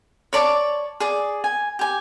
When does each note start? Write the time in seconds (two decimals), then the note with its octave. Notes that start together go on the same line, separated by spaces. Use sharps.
0.33 C#5 D5 A5 D6
1.00 G#4 D5
1.44 G#5
1.79 G4 G#5